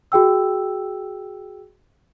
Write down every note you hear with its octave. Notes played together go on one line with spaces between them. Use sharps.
F#4 G#4 G5 E6